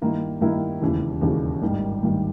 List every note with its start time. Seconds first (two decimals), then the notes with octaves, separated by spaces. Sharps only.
0.01 G2 D#3 A#3 E4
0.41 G2 D#3 A#3 E4
0.82 E1 D#2 C#3 E3
1.21 E1 D#2 C#3 E3
1.62 G#1 G2 D#3 G3
2.02 G#1 G2 D#3 G3